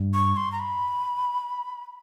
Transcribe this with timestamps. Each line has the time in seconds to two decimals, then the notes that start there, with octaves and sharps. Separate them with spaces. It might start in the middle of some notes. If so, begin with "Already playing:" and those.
Already playing: G2
0.14 C#6
0.36 C6
0.52 A#5
0.60 B5